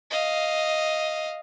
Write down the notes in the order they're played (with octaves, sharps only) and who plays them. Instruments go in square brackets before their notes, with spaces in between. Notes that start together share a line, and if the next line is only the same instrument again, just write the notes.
[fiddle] D#5 F5